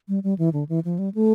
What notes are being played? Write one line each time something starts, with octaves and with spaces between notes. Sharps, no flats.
G3
G3
E3
D3
E3
F3
G3
A3